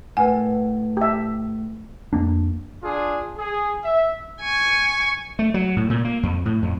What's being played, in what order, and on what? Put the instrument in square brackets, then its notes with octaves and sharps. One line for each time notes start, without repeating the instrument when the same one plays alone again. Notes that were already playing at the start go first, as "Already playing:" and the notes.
[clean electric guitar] A2 [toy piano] A#4 B4 F#5 [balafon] G#5
[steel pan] G4 E5
[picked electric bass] F2 F3 A#3 D4
[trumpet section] D4 F4 G#4
G#4
E5
[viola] G#5 C#6
[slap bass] A3
F#3
A2
A#2
A#3
F2
A2
F2